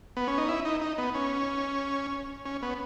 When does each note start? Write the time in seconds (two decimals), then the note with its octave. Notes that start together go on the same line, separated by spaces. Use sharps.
0.17 B3
0.28 C#4
0.38 D#4
0.49 E4
0.65 D#4
0.82 D#4
0.98 B3
1.15 C#4
2.45 C#4
2.62 B3